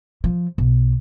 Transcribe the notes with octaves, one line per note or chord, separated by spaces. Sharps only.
F3
B1